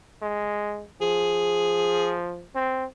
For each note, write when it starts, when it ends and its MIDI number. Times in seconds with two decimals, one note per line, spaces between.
0.22 0.85 56
1.01 2.46 53
1.01 2.16 68
2.55 2.85 60